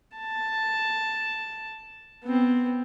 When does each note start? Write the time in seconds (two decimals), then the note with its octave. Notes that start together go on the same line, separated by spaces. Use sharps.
0.17 A5
2.24 B3 C4